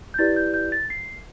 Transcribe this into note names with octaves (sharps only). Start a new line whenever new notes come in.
G6
E4 G4 B4 D5 A6
G6
G6
A6
C7